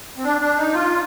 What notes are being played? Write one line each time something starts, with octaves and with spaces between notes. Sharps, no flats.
C4
D4
D4
D#4
F4